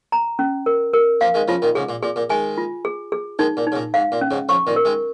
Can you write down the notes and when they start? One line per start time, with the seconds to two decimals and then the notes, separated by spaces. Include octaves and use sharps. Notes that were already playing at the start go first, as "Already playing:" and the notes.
0.12 A#5
0.39 C#4
0.66 A#4
0.94 A#4
1.21 F3 A#3 F5
1.34 D#3 G#3
1.48 C#3 F3 F4
1.62 A#2 D#3
1.75 G#2 C#3 G#4
1.89 A#2
2.03 A#2 G#4
2.16 A#2
2.30 D#3 G#3 G#5
2.58 F4
2.85 G#4
3.12 G#4
3.39 D#3 G#3 D#4
3.57 A#2
3.67 D#4
3.72 C#3
3.76 A#2
3.94 G#2 F5
4.12 A#2
4.21 C#4
4.31 G#2 C#3
4.49 C#3 F3 C#6
4.67 A#2 D#3
4.76 A#4
4.85 D#3 G#3